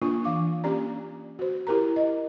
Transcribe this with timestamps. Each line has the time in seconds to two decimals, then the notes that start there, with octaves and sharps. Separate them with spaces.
0.02 A#3 D4 F4 C#6
0.24 E3 F5 D6
0.64 A#3 C#4 G4 D5 A#5
1.39 F#4 C5
1.67 E4 G4 A#4 A#5
1.96 D#5